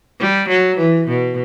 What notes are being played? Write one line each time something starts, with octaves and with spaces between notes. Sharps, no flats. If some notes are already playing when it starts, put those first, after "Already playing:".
G3
F#3
E3
B2